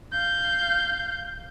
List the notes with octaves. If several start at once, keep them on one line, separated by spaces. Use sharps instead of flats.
F5 G6